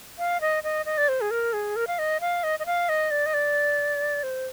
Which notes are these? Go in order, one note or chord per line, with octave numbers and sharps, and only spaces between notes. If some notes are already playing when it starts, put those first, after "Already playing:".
F5
D#5
D#5
D#5
D5
C5
G#4
A#4
G#4
A#4
F5
D#5
F5
D#5
D#5
F5
D#5
D5
D#5
D5
C5